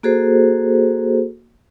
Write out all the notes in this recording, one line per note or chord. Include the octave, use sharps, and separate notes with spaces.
A#3 F#4 G#4 A4 C5